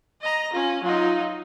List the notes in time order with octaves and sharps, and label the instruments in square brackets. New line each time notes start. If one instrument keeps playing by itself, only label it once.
[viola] D#5 A#5
[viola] C#4 [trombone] F4
[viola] F#3 D#4 [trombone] F4